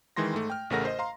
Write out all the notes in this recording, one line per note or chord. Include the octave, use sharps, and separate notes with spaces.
D#3 E3 G#3 C6 A#6
G#2 A3
G5 F6
A1 C#3 A3 A#4 F#5 A#6
C5 D#5
F5 A#5 C6